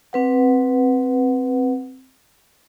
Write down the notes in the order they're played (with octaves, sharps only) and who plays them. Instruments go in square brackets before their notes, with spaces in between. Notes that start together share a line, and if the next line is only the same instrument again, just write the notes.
[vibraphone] C4 B4 F#5